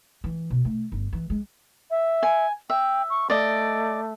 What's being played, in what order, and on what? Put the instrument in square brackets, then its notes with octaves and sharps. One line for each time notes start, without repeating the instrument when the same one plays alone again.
[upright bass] E3
B2
A3
G1
E3
G#3
[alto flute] E5
[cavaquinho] G#5
[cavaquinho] E5 [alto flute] G5
[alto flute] C#6
[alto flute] A3 [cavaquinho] D5 D#5